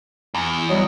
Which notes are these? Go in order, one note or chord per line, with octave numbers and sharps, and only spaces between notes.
E2
F#3 G3 D#5